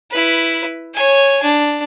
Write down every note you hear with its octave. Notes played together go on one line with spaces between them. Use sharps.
E4 B4
C#5 G#5
D4